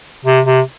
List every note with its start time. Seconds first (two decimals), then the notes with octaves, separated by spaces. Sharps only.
0.25 C3
0.45 C3